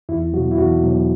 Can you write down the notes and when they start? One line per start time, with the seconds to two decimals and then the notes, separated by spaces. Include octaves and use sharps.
0.09 E2 E4
0.33 F#3 F#4
0.37 B2
0.51 E4
0.58 E2 F#4
0.83 B2 F#3